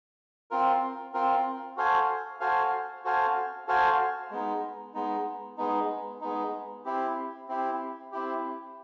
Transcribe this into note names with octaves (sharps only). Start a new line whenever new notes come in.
C4 F4 A#4
C4 F4 A#4
F#4 A4 C5 F5 G#5
F#4 A4 C5 F5 G#5
F#4 A4 C5 F5 G#5
F#4 A4 C5 F5 G#5
G#3 B3 D#4
G#3 B3 D#4
G#3 B3 D#4
G#3 B3 D#4
C4 E4 G4
C4 E4 G4
C4 E4 G4